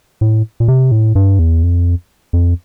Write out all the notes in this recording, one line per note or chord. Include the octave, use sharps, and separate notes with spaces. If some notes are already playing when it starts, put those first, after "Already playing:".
A2
A#2
C3
A2
G2
E2
F2
F2